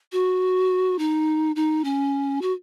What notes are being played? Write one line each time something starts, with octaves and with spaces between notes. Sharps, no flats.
F#4
D#4
D#4
C#4
F#4